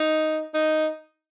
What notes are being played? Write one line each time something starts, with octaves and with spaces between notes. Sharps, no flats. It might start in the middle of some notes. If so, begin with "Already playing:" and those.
Already playing: D#4
D#4